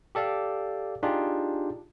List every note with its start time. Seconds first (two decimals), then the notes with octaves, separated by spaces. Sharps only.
0.15 G4 A4 D5 F5
1.03 D4 D#4 F4 G4 G#4